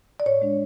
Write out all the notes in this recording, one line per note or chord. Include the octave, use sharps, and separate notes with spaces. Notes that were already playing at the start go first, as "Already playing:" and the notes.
D5
A2 C#5
G#3 D4